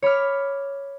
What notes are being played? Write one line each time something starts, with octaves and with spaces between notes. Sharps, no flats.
C#5 B5 D6 F6